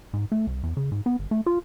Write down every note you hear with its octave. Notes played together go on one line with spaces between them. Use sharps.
G#2
A3
C2
E2
C#3
G#2
B3
G1
A3
F4